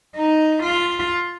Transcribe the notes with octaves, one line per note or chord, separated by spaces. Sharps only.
D#4
F4